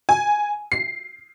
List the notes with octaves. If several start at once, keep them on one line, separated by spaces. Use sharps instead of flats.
G#5
C7